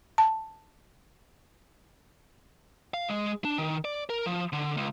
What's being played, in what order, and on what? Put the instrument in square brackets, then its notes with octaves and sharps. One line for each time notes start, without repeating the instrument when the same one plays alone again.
[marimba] A5
[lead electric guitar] F5
G#3
D4
D#3
D5
A#4
F3
D3
C#2